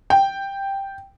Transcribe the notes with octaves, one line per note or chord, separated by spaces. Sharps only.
G5